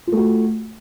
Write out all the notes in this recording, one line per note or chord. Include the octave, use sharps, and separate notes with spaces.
A3 F4 F#4